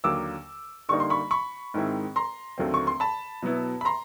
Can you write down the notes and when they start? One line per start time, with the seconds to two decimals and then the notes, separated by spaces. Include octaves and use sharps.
0.04 D#2 D3 F#3 A#3 D6 E6
0.89 D3 G3 A#3 D#4 C#6
1.00 C6
1.10 B5 C#6
1.31 B5 C#6
1.74 G#2 D#3 G#3 C4 E4
2.16 A#5 C6
2.58 D#2 D3 F#3 A3 C4
2.74 C#6
2.87 C6
3.00 A5 B5
3.42 B2 F#3 B3 E4
3.81 B5
3.85 A#5 C6